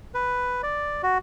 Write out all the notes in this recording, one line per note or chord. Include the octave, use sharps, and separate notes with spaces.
B4
D5
F#4